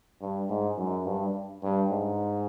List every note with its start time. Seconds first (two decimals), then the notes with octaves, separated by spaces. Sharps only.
0.21 G2
0.50 G#2
0.78 F#2
1.06 G2
1.63 G2
1.91 G#2